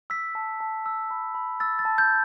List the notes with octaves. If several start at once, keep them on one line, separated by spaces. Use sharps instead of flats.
E6 B6
A5
A5
E6
B5
B5
E6 A6
A6
A5
G6